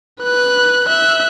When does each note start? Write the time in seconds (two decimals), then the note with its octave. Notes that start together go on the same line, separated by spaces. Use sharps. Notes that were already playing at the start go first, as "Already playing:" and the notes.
0.22 B4 F#6
0.88 E5 F#6